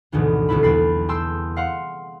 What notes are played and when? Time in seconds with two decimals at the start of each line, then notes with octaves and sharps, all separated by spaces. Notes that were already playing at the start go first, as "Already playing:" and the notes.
0.12 G#1 D2 G#2 B2 D3 E3
0.49 C2 B2 D3 E4 A4 B5
0.63 B1 E2 G5 B5 A6 C7
1.08 G#4 G5 A5 C6 E6 G6
1.57 F5 F#5 C6